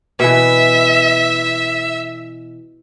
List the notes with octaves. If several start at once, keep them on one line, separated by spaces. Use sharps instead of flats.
B2 E3 E5